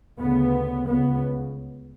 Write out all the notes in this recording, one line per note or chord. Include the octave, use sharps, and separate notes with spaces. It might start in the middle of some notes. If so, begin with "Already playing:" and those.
D2 C#3 B3
C#2 C#3 B3